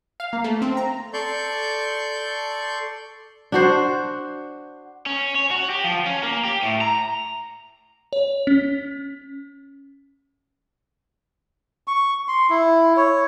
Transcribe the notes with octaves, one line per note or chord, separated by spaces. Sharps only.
F5
A#3
A3
C4
A#5
A4 D5 C6 C#6 G6
D4 F#4 C5
C#4
C#5
F#4
G4
F3
C#4
A#3
G4
A2
A#5
C#5
C#4
C#6
C6
E4
C#5